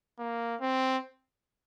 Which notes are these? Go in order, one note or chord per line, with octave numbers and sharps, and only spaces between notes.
A#3
C4